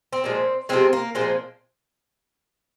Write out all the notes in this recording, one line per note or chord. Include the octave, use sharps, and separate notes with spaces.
C4
A#2 F3 G#3
C3 F3 G#3 C4
A#3
A#2 F3 G#3 C4